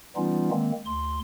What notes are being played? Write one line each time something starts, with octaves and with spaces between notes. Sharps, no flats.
E3 G3 B3 C#4 D#4 F4
D#3 G#3 A#3 C4
D2 C6